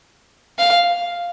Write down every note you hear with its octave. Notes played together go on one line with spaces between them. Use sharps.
F5